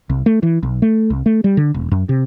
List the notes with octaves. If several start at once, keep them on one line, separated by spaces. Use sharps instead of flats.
C2
A3
E3
B1
A3
C2
A3
G3
D3
E1
F#2
C3